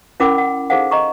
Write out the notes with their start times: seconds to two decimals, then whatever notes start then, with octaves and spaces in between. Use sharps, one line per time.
0.20 C#4 E4 A#4 F#5 B5 D6
0.38 F#5
0.70 D#4 G#4 A4 C5 F5 F#5
0.91 D#5 A#5 C#6